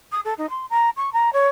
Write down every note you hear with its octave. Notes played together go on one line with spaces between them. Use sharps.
D#6
A4
D#4
C6
A#5
C#6
A#5
C#5